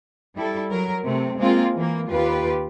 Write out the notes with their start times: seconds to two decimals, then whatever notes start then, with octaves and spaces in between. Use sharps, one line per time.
0.35 G3 E4 A4
0.70 F#3 A#4
1.04 C3 A3 C4
1.38 G#3 A#3 C4 F4
1.75 E3 A#3
2.10 D#2 F4 G4 B4